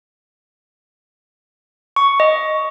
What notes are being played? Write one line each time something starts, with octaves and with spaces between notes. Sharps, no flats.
C#6
D#5